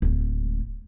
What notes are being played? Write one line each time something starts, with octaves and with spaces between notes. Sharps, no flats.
D1 G#3